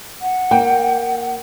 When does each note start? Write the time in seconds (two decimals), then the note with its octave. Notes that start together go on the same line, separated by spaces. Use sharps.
0.22 F#5
0.51 A#3 G5